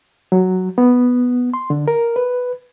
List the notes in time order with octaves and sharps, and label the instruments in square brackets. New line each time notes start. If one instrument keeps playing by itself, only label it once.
[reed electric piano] F#3
B3
C6
D3
A#4
B4